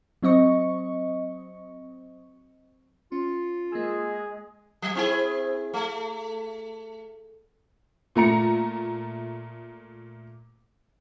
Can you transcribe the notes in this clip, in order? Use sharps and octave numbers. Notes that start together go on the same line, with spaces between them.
F#3 C4 D#5 C#6
C#4 F4
G#3 A#3 G#4 E6
F#3
C4 E4 G#4
A3
A#2 A3 A#5 C#7